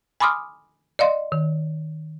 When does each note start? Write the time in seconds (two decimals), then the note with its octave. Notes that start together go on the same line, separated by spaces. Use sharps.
0.20 G#5 B5 C6 D6 D#6 F6
0.99 D5 D#5 F5 C6
1.32 D#3